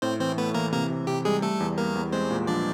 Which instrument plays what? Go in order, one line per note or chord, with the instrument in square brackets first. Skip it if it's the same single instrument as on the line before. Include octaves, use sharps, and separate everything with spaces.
[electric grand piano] A2 [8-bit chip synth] C4 C5
[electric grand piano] E3 [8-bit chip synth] C4 C5
[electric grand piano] A3 [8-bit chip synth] B3 B4
[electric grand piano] E3 [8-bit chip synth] A#3 A#4
[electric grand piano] C3 [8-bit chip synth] A#3 A#4
[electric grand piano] C3
[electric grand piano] C3 [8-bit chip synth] G4
[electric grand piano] G3 [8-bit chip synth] G#3 G#4
[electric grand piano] G3 [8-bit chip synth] A3 A4
[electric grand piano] E2
[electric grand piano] G3 [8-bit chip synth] A#3 A#4
[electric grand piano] E2
[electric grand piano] G#3 [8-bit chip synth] C4 C5
[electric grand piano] A#2
[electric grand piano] F3 [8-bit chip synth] D4 D5